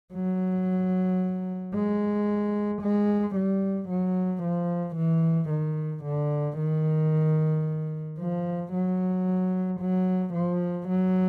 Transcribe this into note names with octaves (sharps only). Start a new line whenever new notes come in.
F#3
G#3
G#3
G3
F#3
F3
E3
D#3
D3
D#3
F3
F#3
F#3
F3
F#3